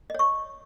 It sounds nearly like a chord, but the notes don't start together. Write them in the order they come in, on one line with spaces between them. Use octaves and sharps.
D#5 C#5 C#6